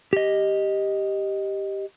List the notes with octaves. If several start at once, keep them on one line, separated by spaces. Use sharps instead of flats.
G4 D#5